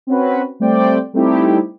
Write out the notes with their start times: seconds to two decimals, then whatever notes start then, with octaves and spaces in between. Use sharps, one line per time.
0.07 C4 C#4 F#4 B4
0.60 G3 A3 C4 C5 D5 G5
1.13 G3 A3 C4 D#4 E4 G4